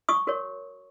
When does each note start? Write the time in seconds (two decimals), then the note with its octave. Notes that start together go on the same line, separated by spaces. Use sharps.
0.09 C#6 D#6
0.27 F#4 A#4 C#5